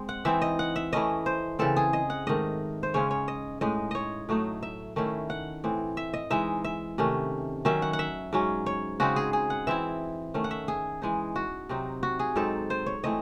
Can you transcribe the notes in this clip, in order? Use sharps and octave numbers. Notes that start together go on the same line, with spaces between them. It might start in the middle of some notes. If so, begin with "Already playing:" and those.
Already playing: G#3 C4
F#5
E3 C4 D#4 E5
D#5
F#5
E5
E3 A3 C#4 E4 D#5
C5
C#3 E3 C4 A4
G#4
D#5
F#5
G#2 D#3 A3 D#5
C5
C#3 G#3 C#4 C#5
C#5
D#5
A2 G#3 D#4 D#5
C#5 D#5
A2 F#3 A3 D#4
E5
D#3 A3 C#4 E4
F#5
A2 E3 C4
E5
D#5
E3 G#3 D#4 E5
E5
C3 D#3 A3 C#4
D#3 F#3 C#4 E5
F#5
F#5
E5
G#2 F#3 C#4
C#5
C#3 G#3 C4 D#4 F#4
G#4
G#4
F#5
E3 C4 E4 E5
D#3 A3 C#4
F#5
E5
G#4
E3 G#3 D#4
F#4
C3 F#3 C4 D#4
F#4
G#4
G#2 F#3 C4 D#4 A4
C5
C#5
E3 A3 C4 D#5